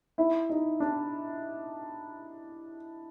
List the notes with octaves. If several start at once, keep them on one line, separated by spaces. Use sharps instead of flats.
E4
D#4
D4